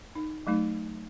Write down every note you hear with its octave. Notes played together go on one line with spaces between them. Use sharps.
D#4
F#3 A3 D#4